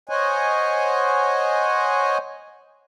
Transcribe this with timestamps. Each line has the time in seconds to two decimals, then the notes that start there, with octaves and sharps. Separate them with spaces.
0.09 C5 C#5 D#5 F#5 G#5